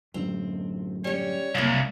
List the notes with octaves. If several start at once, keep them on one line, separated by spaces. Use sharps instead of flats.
F#2 A2 D3 C4
G3 C#4 C#5
F#1 C2 A#3 F5